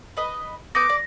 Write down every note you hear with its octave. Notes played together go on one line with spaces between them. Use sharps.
B4 D#5 B5
B3 D6 G6 A#6
D5